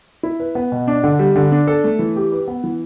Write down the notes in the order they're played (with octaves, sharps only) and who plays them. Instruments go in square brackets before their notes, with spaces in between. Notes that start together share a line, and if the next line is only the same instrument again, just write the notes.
[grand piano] E4
B4
B3
B2
D4
D3
G3
D3
D4
A4
A3
E3
G4
B4
B3
E3